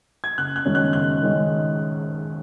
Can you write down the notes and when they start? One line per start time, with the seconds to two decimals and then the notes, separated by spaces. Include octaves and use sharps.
0.24 G#6
0.37 F#1 F#6
0.56 F#6
0.66 F#2 D#3 G#3 C#4
0.75 F#6
0.93 F#1 F#6
1.22 D#3 G#3 C#4